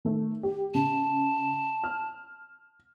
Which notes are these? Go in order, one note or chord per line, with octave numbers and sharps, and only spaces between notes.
D#3 A3
G4
C#3 A5
F6